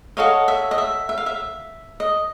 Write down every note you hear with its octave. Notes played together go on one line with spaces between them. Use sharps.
F#4 A4 C#5 D#5 F5
E5
D#5
E5
E5
F5
E5
D#5